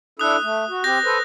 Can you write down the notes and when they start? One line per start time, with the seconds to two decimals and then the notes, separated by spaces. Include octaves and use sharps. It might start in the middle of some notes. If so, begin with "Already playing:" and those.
0.19 D4 E4 A4 D#6 F#6
0.42 A3
0.69 F#4
0.84 C4 G4 G6 A#6
1.05 A4 B4 C5